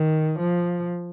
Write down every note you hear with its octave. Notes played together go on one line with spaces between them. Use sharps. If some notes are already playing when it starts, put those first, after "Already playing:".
Already playing: D#3
F3